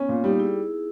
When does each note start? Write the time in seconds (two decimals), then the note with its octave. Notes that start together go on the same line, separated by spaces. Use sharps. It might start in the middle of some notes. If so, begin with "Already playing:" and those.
Already playing: B3 C#4
0.09 A#2
0.24 G3 D#4 G4
0.40 E4 G#4